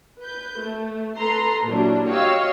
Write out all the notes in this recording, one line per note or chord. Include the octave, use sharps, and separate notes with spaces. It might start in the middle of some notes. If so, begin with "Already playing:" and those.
B4 G6
A3
A4 B4 A#5 C6
A#2 E3 F#3 G3 D4
F#4 G4 C#5 D#5 F5 E6